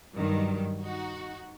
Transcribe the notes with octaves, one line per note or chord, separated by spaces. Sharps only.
G2 D#3 F#3
D#4 F#4